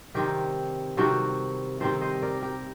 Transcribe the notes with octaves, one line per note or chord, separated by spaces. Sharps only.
C3 D#3 G3 C4 G4 A#4
C3 D#3 G3 C4 F#4 A4
C3 D#3 G3 C4 A4 C5
C5 D#5
A#4 D5
G4 A#4